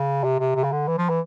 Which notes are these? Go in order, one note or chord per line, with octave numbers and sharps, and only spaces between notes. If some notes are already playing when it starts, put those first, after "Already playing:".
Already playing: C#3
C3
C3
C3
C#3
D3
E3
F3
E3